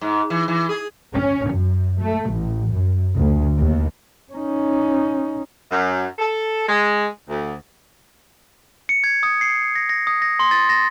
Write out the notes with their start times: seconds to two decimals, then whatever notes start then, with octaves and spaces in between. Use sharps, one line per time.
0.01 G#2
0.30 E3
0.48 E3
0.69 G#4
1.15 C#4
1.50 F#2
2.01 A3
2.33 A1
2.72 F#2
3.15 D2
3.57 D#2
4.33 C#4 D#4
5.70 F#2
6.18 A4
6.66 G#3
7.27 D2
8.89 C#7
9.04 G#6
9.23 D#6
9.41 C7
9.76 A#6
9.89 A#6
10.07 D#6
10.22 A#6
10.39 C6
10.51 A6
10.69 A#6